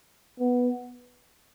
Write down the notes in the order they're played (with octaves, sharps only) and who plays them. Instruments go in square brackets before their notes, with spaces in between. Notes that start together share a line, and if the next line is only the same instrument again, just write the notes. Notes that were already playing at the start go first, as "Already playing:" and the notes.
[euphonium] B3